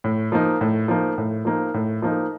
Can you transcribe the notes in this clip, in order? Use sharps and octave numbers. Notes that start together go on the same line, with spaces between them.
A2
F3 A#3 D#4
A2
F3 A#3 D#4
A2
F3 A#3 D#4
A2
F3 A#3 D#4